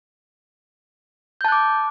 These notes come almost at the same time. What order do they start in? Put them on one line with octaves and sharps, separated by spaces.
G6 A5 F#6 D6